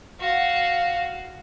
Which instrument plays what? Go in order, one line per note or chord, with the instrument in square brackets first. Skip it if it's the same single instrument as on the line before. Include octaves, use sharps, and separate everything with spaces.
[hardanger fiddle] F#4 F5